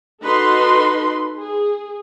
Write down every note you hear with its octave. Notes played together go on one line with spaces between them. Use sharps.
D#4 F#4 A4 B4 C6
G#4